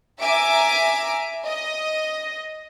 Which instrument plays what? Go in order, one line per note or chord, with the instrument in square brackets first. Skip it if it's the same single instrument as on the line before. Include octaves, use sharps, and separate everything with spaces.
[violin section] E5 G#5 A#5 D6 D7
D#5